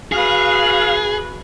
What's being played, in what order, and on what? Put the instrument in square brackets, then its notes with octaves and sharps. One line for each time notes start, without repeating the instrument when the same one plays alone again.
[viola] F#4 B4 [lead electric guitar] G#4 [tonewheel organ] F5